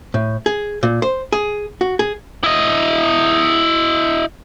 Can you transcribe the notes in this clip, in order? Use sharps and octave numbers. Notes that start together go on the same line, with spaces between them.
A2
G#4
A#2
C5
G#4
F#4
G#4
E4 D#5